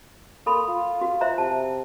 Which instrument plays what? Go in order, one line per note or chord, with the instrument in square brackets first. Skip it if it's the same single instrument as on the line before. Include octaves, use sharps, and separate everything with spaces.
[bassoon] A#3 [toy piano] A4 B5 C6
[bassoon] F4
[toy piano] F#4
C5 E5 A#5
[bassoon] C3 [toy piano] A5